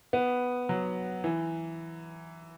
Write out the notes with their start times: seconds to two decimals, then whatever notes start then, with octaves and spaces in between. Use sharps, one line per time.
0.13 B3
0.69 F#3
1.24 E3